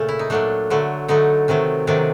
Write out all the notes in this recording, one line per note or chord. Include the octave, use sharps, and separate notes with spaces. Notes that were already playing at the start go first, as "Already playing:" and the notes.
Already playing: A#2 C#3 A3
E4
D#4
A#2 F#3 A3 D4
D3 F#3 A3
D3 F#3 A3 D#4
C3 D#3 F#3 A3
C3 D#3 F#3 A3 D4